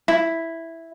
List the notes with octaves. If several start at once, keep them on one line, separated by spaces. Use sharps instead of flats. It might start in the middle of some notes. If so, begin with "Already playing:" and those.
E4